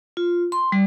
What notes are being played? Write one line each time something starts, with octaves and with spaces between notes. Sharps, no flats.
F4
C6
G3